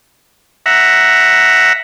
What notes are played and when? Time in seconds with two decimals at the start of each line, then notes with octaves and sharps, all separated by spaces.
0.66 E5 F#5 A#5